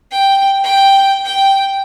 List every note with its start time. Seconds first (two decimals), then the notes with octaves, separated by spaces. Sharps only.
0.11 G5
0.64 G5
1.25 G5